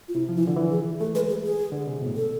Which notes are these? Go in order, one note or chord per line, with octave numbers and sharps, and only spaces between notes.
F4
C3 E4
F3
E3 E4
F4
D3
E3
G#4
A3 A4
G#3 B4
G#4
G#4
D3
C3
B2
A2
A4